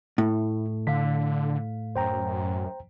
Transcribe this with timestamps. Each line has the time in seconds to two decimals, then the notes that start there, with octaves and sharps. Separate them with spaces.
0.18 A2 E4
0.87 D3 F5 B6
1.96 F#2 C5 G5 A#5